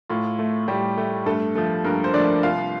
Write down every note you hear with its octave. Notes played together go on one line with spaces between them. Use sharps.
A2 F4
A3
A2 G3 G4
A3
G2 A3 A4
F3 A3
G2 A#3 A#4
C5
F3 A3 D4 D5
C2 F4 F5